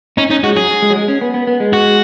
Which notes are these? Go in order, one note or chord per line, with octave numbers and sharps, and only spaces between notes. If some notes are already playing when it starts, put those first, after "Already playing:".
C#4 D#4
C#4 D#4
G#3 F#4
F#3 G#4
G#3
F#3
G#3
C#4
B3
B3
B3
G#3
F#4